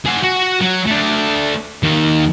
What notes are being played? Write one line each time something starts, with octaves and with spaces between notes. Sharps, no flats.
G#4 F#5
F#4
F#3
A3 D4
D#2 D#3